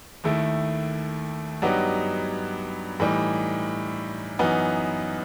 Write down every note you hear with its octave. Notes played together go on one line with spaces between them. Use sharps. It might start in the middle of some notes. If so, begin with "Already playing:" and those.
D#2 D#3 A3 E4
G2 F#3 B3 D#4 G4
A2 E3 G3 D#4
F#2 E3 B3 D#4